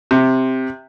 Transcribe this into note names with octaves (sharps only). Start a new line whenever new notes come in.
C3